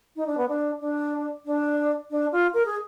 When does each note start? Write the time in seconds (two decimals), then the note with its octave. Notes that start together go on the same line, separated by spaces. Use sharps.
0.16 D#4
0.27 D4
0.37 B3
0.48 D4
0.81 D4
1.46 D4
2.11 D4
2.32 F4
2.54 A#4
2.65 G#4